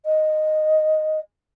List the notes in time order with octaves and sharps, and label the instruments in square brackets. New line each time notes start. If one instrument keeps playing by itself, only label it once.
[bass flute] D#5